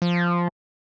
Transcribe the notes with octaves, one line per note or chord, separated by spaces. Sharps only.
F3